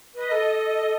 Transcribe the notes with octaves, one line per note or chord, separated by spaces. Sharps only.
B4 D#5
A4